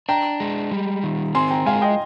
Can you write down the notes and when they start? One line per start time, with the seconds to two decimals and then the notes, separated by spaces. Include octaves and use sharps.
0.09 D4 G5 A#5
0.40 G#3
0.71 G3
1.04 D#3
1.35 C4 G#5 C6
1.51 G5 A#5
1.66 G#3 F5 G#5
1.82 D#5 G5